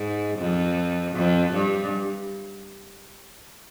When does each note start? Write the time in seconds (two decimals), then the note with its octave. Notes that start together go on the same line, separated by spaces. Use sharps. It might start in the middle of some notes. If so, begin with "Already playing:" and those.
Already playing: G#2
0.38 F2
1.15 F2
1.53 G2